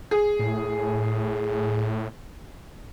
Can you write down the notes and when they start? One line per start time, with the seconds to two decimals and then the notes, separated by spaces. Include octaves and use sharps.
0.11 G#4
0.39 A2